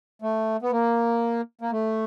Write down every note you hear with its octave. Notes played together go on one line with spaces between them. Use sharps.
A3
B3
A#3
A#3
A3